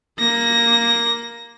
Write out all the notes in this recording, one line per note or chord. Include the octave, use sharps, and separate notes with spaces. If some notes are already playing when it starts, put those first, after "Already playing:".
A#3 A#6